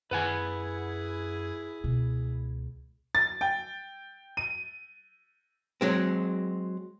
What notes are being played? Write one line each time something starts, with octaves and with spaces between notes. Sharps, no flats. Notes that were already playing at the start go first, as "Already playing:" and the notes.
F#2 E4 G#4 B4 F#5 G#5
C#2 B2
A6
G5
D#7
F#3 G#3 C4